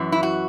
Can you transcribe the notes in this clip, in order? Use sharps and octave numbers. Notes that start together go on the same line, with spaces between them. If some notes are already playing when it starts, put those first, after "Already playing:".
Already playing: F#2 E3
E4
F#4